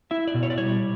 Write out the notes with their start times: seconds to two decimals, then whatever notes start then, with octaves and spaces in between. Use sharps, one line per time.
0.11 E4 E5
0.27 D5
0.34 B2
0.43 C#5
0.50 D5
0.58 G3 C#5